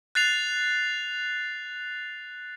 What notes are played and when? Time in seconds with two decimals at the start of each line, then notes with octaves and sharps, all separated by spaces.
0.15 F#6 A6 C7 F7